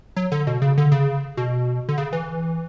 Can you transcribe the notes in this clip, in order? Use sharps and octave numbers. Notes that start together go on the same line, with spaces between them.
F#3
D3
B2
C#3
D3
C#3
B2
D3
C#3
E3